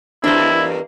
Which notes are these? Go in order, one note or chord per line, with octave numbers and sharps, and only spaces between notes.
E2 G2 A#3 D4 E4 C5